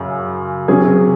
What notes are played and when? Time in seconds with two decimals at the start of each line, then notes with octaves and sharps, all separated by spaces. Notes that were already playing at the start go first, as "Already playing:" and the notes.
Already playing: F#2 C#3
0.68 C3 F#3 C#4 G#4